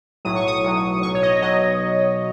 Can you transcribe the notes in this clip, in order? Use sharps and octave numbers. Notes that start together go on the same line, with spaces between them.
B1 A2 F#3 D#6
C#6
D#6
B1 A2 F#3
B1 B2 F#3 C#6
C#5
D#5
B1 B2 F#3 D#5